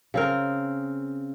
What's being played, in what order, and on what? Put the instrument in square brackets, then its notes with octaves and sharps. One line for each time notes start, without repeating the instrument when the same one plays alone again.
[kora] C#3 C4 A#4